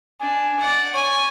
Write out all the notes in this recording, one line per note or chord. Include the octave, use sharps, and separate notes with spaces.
D4 G#5
D5 F#5
C#5 G#5